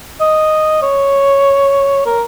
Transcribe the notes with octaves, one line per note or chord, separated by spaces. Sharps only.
D#5
C#5
A#4